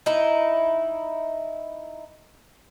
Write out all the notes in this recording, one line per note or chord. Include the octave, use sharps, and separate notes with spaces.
D#4 E4